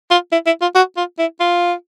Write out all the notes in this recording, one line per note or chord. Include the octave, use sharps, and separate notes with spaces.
F4
E4
E4
F4
F#4
F4
E4
F4